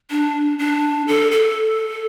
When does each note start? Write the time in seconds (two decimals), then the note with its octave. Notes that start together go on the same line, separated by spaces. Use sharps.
0.11 D4
0.59 D4
1.08 A4
1.32 A4